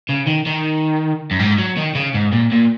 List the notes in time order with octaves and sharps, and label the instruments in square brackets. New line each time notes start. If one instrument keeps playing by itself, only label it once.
[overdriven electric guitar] C#3
D#3
D#3
F#2
G#2
F#3
D#3
C#3
G#2
A#2
A#2